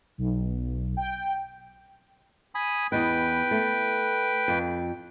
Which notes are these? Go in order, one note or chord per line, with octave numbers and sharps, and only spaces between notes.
B1
G5
G#5 B5 D#6
E2 B4 D#5 G5
A3
F2